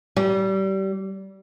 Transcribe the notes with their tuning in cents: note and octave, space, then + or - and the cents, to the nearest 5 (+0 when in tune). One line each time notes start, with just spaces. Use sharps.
G3 -25